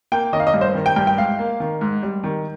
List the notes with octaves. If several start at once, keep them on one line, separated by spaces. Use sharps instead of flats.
A#3 G5
D#3 D#5
F5
D#5
G2
C5
D#3
G5
G2 G5
G5
G#2 F5
A#3
D#3
G#2
G3
D#3